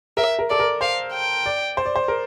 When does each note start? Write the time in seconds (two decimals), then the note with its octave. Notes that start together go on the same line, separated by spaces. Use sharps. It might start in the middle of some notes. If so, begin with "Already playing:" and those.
0.17 A#4 E5
0.39 A#4
0.50 A4 D5
0.60 A#4
0.81 C5 F5
1.13 G5
1.46 D5
1.77 C5
1.86 D5
1.96 C5
2.08 A#4